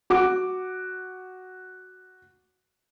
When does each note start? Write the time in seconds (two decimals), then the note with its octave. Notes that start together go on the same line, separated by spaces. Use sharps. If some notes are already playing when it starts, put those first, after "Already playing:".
0.10 F#4 D6